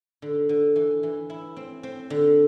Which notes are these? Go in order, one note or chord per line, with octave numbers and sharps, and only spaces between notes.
D3
D3
E3
E3
E4
C4
C4
D3